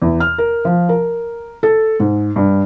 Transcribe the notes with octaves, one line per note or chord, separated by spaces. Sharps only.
E2
F6
A#4
F3
A#4
A4
G#2
G2